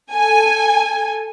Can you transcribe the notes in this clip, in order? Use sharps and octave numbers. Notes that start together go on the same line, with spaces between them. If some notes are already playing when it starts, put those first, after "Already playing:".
A4 G#5